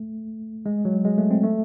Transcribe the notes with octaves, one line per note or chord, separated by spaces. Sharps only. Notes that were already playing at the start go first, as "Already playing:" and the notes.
Already playing: A3
G#3
F#3
G#3
A3
C4
A3